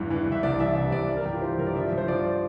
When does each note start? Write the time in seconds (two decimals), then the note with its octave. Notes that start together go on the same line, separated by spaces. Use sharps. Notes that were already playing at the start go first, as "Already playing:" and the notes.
Already playing: E2 G2 E3
0.10 E3
0.26 G2
0.32 E5
0.43 C2 D5
0.60 E3 E5
0.76 C3 E5
0.92 C2 D5
1.09 E3
1.17 A#4
1.25 G2 G4
1.34 F4
1.42 E3 C5
1.59 G2 A#4
1.67 D5
1.75 F3 E5
1.92 G2
1.98 C5
2.08 F3 D5